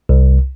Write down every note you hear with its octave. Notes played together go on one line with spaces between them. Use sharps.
C2